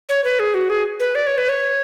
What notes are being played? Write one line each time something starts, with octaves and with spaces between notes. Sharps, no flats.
C#5
B4
G#4
F#4
G#4
B4
D5
C#5
B4
C#5